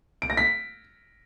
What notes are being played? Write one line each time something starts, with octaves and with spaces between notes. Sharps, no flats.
D7
A#6
B6